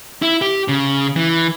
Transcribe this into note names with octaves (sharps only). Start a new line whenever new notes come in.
E4
G4
C#3
E3